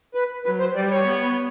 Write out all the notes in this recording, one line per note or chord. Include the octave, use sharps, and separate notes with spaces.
B4
F#3 B4
C5
G3 D5
C#5
B3